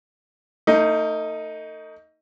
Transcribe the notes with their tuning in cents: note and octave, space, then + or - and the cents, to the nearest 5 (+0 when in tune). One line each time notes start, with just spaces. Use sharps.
A3 +45 D#4 +10